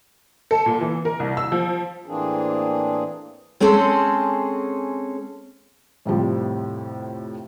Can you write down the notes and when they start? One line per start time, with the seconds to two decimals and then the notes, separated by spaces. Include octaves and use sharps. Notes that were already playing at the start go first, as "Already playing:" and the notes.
0.51 A4
0.66 A#2
0.81 E3
1.05 A#4
1.20 C2
1.37 E6
1.52 F3
2.06 A2 E3 A#3 C4 D4 G#4
3.60 G#3 C4 C#4 G#4 A4
6.06 F2 A2 C3 F3 G3